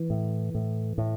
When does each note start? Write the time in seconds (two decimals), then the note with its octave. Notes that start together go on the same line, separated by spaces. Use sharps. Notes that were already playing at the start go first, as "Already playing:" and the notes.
Already playing: E3
0.10 A2
0.55 A2
0.98 A2